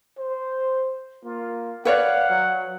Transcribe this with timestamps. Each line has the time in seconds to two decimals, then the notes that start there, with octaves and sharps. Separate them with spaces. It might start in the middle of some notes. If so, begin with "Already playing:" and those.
0.18 C5
1.25 A#3 F4
1.85 B4 C#5 D5 F5 F#5
2.30 F#3